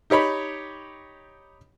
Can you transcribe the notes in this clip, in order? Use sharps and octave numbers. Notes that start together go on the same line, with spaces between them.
D#4 G4 C#5 B5